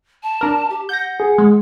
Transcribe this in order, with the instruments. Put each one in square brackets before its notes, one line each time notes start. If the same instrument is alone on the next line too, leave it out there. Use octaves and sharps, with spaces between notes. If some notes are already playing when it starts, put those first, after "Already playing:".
[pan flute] A5
[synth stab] D4 A#4
[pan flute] G4
[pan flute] F#5 [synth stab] G6 A#6
[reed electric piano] G#4
[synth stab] G#3